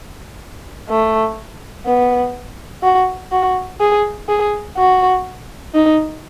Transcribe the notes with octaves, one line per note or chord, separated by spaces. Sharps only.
A3
B3
F#4
F#4
G#4
G#4
F#4
D#4